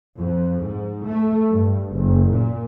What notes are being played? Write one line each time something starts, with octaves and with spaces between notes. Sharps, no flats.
F2
G#2
A3
G2
F#1
A#2